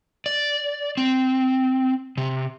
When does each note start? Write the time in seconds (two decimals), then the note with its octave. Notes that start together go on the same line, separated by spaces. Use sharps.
0.26 D5
0.97 C4
2.17 C3